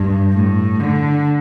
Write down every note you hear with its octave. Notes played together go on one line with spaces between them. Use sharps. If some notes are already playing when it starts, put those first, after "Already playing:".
Already playing: G2
A2
D3